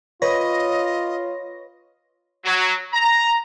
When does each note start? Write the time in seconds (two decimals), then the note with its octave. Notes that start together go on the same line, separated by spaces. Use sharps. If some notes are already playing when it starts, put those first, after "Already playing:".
0.22 F4 B4 C#5 D#5 A#6 D#7
2.45 F#3
2.93 A#5